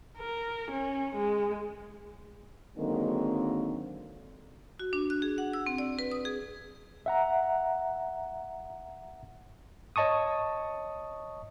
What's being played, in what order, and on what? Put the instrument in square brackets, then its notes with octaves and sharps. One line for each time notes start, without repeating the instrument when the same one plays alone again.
[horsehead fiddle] A#4
C#4
G#3
[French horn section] D3 D#3 F#3 G#3 A#3 C4
[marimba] F#4
D4
F#6
G#4
F#5
E6
C4
D5
B4
D#6
G#4
[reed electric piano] E5 F#5 A#5
[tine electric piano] C#5 D#5 A5 C#6 D#6